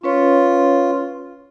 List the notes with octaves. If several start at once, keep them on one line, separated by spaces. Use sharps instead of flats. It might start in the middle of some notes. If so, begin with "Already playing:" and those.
C#4 F4 B4 C#5